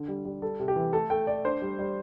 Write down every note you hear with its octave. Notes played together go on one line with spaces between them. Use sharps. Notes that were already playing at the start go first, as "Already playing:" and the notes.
Already playing: D3
G3
G3
G3 A4
C3
G4
E3
A3 A4
A3 G5
A3 D5
D4 C5
G3
G3